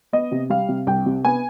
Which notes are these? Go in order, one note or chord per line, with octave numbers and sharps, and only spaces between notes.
B3 D#5
C3
G3 F5
C3
C2 G5
C3
B3 G#5